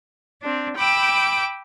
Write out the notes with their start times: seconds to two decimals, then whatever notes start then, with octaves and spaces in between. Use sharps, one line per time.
0.42 C4 D4
0.76 G5 B5 D6 E6